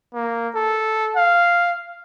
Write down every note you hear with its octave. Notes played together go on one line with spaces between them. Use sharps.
A#3
A4
F5